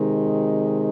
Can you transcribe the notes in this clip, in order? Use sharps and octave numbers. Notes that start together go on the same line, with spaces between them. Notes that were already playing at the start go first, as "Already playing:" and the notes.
Already playing: C3 D#3 G#3